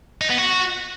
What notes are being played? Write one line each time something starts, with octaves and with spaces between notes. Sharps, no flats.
D#4
B3
F#4